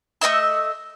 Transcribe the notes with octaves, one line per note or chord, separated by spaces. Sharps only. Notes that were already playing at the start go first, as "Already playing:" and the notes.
A3 D#5 E5 E6